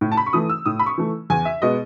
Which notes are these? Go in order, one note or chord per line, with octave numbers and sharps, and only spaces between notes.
A2
A5
B5
C#6
E3 A3 D#6
E6
A2 D#6
B5
C#6
E3 A3
E2 G#5
E5
B2 G#3 B3 D#5